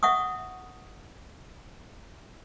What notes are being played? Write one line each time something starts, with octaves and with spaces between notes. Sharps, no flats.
E5 F#5 C#6 D#6